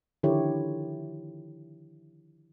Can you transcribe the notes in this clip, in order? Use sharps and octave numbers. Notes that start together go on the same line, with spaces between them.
D3 D#3 F3 E4 G4 C#5